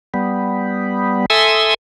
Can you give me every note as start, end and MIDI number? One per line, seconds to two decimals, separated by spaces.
0.14 1.26 55
0.14 1.26 59
1.30 1.74 69
1.30 1.74 76
1.30 1.74 80
1.30 1.74 84
1.30 1.74 87
1.30 1.74 88